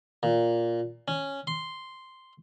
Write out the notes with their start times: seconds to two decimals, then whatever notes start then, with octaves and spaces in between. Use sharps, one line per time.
0.23 A#2
1.08 C#4
1.47 C6